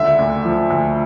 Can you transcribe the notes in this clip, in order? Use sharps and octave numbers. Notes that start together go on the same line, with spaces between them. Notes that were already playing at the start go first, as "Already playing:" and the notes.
Already playing: C#2 D3 E5
D2
F3
D2